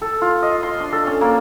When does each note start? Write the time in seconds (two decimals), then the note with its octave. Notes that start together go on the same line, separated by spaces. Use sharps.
0.02 A4
0.22 F4
0.42 D#5
0.63 C6
0.80 D4
0.92 A4
1.07 C#4
1.21 A#3